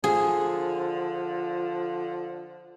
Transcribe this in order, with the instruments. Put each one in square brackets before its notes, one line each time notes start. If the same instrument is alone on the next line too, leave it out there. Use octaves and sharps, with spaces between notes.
[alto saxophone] D3 [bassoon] F3 [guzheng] G#4